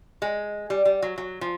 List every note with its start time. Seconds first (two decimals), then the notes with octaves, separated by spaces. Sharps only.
0.22 G#3
0.70 G3
0.85 G3
1.02 F#3
1.18 F#3
1.41 F3